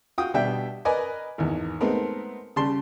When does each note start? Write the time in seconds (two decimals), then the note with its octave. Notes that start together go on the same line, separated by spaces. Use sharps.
0.18 F4 F#4 G5 D#6
0.34 B2 G3 D4 E5 G5
0.85 A#4 B4 D5 D#5 G#5
1.38 G#1 E2
1.80 G#3 A3 B3 C4 D#4 A#4
2.56 C#3 G3 A5 C6